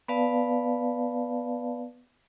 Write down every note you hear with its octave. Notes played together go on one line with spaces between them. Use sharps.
B3 B4 D5 F5 A5